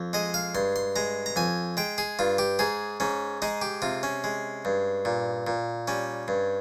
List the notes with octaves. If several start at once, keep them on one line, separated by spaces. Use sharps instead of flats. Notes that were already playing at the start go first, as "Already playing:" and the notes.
Already playing: F2
G#3 D#5
F5
G2 C6
C6
G#3 A#5
A#5
F2 G#5
G#3 G5
G#4
G2 F4
G4
G#2 G#4
G#2 C#4
G#3 D#4
G4
C3 F4
C#4
G#3
G2
A#2
A#2
G3 C#4
G2